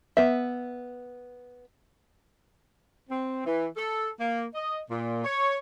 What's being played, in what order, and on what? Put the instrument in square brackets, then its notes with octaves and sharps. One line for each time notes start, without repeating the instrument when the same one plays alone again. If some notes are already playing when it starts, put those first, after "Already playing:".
[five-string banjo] B3 E5
[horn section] C4
E3
A4
A#3
D#5
A#2
C#5